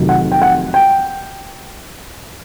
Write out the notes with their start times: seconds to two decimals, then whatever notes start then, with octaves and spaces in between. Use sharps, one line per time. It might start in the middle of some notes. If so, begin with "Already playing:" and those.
Already playing: F1 F2 C3 D#3 F#3
0.09 F#5
0.32 G5
0.42 F#5
0.74 G5